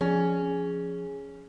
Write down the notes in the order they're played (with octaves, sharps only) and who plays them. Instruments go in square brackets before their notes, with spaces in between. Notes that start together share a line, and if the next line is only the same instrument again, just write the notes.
[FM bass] F3 [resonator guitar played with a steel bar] C#4 [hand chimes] G#4